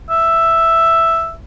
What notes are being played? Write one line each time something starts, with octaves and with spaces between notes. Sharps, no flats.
E5